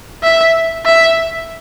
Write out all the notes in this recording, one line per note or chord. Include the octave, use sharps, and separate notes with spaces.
E5
E5